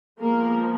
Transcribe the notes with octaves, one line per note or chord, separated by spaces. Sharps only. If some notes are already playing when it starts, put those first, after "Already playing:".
F3 G#3 A#3 B3 A#4